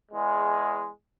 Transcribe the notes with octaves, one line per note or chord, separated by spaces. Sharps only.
E2 G#3